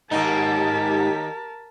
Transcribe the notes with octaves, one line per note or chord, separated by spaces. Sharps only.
D#2 G#2 A#3 D#4 G4 A#4 A5 B6